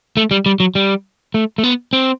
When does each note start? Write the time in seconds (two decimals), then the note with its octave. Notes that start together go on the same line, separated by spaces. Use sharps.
0.17 A3
0.31 G3
0.46 G3
0.60 F#3
0.75 G3
1.34 A3
1.58 A3
1.63 B3
1.93 C4